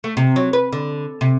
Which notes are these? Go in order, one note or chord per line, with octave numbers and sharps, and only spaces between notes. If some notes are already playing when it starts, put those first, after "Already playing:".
A3
C3
F#3
B4
D3
C3